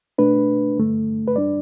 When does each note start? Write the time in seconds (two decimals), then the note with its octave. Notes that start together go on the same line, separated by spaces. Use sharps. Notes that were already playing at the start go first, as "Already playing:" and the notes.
0.18 B2 A3 D4 B4
0.77 G2 D3 A3
1.28 B4
1.36 G2 G3 D4 D5